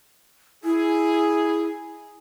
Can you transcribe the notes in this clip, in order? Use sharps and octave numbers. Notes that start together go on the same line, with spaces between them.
E4 G#4